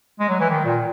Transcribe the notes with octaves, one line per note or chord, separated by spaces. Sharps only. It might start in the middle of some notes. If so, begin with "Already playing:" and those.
G#3
F#3
E3
D#3
A#2